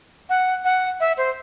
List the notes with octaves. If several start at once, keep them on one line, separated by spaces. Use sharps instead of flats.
F#5
F#5
E5
C5